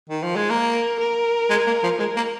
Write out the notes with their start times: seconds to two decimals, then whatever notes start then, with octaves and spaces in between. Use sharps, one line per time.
0.09 D#3
0.23 F3
0.36 G#3
0.50 A#3 A#4
1.00 A#4
1.50 G#3
1.67 A#3
1.83 F3
1.99 G#3 A#4
2.16 A#3